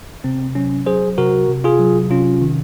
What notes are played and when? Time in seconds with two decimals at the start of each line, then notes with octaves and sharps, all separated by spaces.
0.24 C3 C4
0.55 F#3 C#4
0.86 F#3 G#4 C5
1.18 C3 F#4 A#4
1.49 C3
1.64 F4 G#4
1.80 F#3
2.10 C3 C#4 F4
2.41 D#3